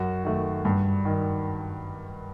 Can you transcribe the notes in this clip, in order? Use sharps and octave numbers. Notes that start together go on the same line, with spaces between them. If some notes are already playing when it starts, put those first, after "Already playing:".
Already playing: F#2 F#4
D#3 A3
G2
D#3